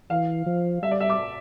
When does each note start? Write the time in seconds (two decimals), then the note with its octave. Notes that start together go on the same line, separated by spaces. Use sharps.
0.10 E3 F5
0.46 F3
0.82 G3 E5
0.91 D5
1.00 E5
1.10 D6